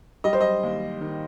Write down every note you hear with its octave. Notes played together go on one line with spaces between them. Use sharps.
G3 D#5
C5
D#5
D#2
D#3